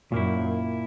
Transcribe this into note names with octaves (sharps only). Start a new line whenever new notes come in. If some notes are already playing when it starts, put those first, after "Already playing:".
F#2 A#2 A#3 E4